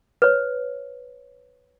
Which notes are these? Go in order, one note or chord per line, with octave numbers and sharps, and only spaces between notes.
B4 C#5